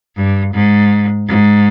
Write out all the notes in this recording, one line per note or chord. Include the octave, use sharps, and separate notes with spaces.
G2
G#2
G#2